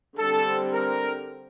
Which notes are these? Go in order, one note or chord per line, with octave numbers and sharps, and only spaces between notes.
D3 G3 C4 A4
A#4